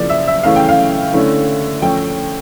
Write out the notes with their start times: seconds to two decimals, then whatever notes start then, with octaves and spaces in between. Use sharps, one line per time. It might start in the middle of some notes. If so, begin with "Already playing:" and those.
Already playing: C#3 F3 A#3 E4 D5
0.10 E5
0.27 E5
0.43 C#3 E3 A3 C#4 E4 F5
0.56 G5
0.69 F5
1.13 D3 A3 C#4 E4
1.82 F3 A3 C#4 G5